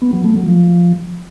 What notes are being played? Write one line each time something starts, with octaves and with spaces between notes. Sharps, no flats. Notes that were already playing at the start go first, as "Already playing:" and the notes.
B3
F#3
A3
F#3
F3